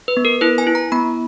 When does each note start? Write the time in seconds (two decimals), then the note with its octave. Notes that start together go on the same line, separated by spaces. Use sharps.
0.08 B4
0.17 B3
0.25 A#4
0.41 E4 B4
0.58 G#5
0.67 E4
0.75 A#5
0.92 B3 B5